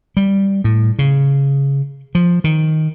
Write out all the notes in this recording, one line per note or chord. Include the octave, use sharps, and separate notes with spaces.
G3
A2
C#3
F3
D#3